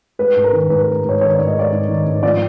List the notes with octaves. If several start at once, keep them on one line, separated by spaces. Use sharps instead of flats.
G#3 B4
G#2
A#4
D#3
G#2 B4
B4
G#3
G#2 C#5
D#3 C#5
D5
G#2
D#5
G#3 D5
G#2
D#3
G#2
F3 D5